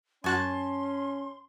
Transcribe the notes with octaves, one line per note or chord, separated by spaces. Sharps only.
F#2 C#4 F#4 G#5 A5 C6 F#6